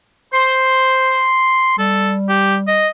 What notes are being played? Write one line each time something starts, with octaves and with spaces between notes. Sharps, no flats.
C5 C6
G3 A4
G4
D#5